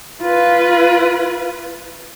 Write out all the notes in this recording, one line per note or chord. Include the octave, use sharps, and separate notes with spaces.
F4 B4